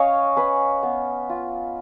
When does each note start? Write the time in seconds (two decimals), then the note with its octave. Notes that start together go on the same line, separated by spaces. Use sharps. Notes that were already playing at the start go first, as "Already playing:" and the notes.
Already playing: C#4 C#5 D#5 F5 G#5
0.36 C#4 B4
0.83 B3
1.29 F4